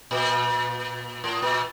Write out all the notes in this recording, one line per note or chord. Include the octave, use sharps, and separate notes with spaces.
A#2
A2
A#2